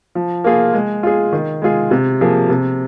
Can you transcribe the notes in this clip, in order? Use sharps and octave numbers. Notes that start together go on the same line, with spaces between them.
F3
A#3 F4 G#4
G#3
F4 G#4
D#3
G#3 F4 G#4
C3
F3 A#3 G#4
C3